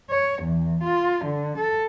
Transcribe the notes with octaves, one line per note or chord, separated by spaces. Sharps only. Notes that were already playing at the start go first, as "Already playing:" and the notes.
C#5
E2
F4
D3
A4